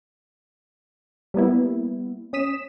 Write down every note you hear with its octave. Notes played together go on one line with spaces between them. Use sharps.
G3 A#3 B3 E4
C#4 D#6 B6 E7